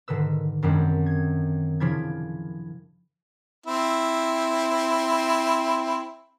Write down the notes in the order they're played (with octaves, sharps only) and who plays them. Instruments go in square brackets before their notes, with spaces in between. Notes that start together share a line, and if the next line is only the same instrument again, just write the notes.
[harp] G#2 D3 D#3 B4 E6
F#2 D#3 G3 G#3 C4 D4
G#6
C#3 F3 D4 E4 G#6
[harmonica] C4 E4